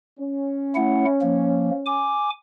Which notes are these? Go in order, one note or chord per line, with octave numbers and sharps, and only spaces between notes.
C#4
A3 E4 F#5
F3 A#3
G#5 D6